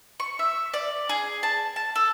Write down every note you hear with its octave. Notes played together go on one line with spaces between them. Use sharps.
C#6
E5
D5
G#4
A5
A5
A4